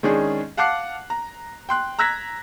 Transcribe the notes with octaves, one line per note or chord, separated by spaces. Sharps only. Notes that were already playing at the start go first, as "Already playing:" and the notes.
D#3 G#3 C#4 D4 G#4
F5 F#5 A5 D6 F#6 C7
A#5
G5 C6 F#6
A#5 E6 F#6 G#6 A#6 B6